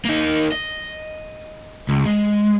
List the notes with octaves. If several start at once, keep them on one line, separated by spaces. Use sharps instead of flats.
A#3 D#4
D#5
C#2
G#3